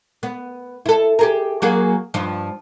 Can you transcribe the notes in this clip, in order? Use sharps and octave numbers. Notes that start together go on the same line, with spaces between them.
B3
E4 A4
G4 G#4 A#4
F#3 A#3 G#4
G2 F3